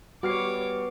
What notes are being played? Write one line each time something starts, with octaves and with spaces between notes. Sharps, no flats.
G3 B3 F#4 C#5 D6 F6 C7